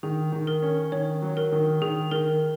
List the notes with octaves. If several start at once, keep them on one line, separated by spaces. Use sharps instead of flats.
D#3 G#4
D#3
A#4
C#4
D#3 C#5
F#3
A#4
D#3
D#3 G#4
D#3 A#4